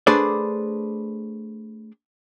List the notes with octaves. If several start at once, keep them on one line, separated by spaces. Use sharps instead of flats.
A3 D4 G#4 B4 C5 D5